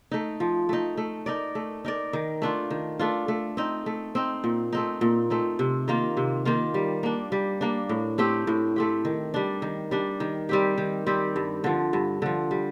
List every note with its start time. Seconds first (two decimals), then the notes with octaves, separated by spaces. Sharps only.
0.11 A3 D#4
0.40 F3
0.69 A3 D#4
0.97 A3
1.26 D#4 A#4 D5
1.55 A3
1.85 D#4 A#4 D5
2.13 D#3
2.42 A3 D4 F4
2.70 D#3
2.99 A3 D4 F4
3.28 A3
3.57 C4 D#4
3.86 A3
4.15 C4 D#4
4.44 A#2
4.72 A3 C4 D#4
5.01 A#2
5.30 A3 C4 D#4
5.59 C3
5.88 D#3 A#3 F4
6.17 C3
6.45 D#3 A#3 F4
6.74 G3
7.03 A#3 D4
7.32 G3
7.61 A#3 D4
7.89 A2
8.18 A3 C4 G4
8.47 A2
8.76 A3 C4 G4
9.05 D#3
9.34 G3 D4
9.62 D#3
9.91 G3 D4
10.20 D#3
10.49 G3 C4 G4
10.78 D#3
11.06 G3 C4 G4
11.36 G2
11.64 D3 F3
11.93 G2
12.22 D3 F3
12.51 G3